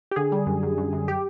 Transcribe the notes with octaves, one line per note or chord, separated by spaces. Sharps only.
G4
D3 G#4
G3
F#2
F#2
F#2
F#2
G4